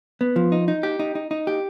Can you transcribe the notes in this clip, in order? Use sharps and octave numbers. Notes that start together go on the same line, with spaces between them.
B3
F3
D#4
D#4
G4
D#4
D#4
D#4
G4